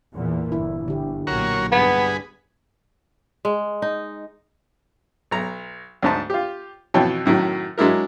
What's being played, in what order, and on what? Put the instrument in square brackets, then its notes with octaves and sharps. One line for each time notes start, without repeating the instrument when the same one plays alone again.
[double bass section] E2 A#2 E3
[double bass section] G1 [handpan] E4
[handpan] D3 G4
[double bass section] B1 A#2 [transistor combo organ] F#4 A#4 C#5
[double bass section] G2 [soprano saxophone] B3 [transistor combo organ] G#4 B4
[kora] G#3
D#4
[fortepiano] B1 A#5
D2 G#2 A5
F4 G4
F2 B2 E3 C#5 G5 A5
F#2 A2 D#3 F#3
F#3 G#3 D4 E4 A#4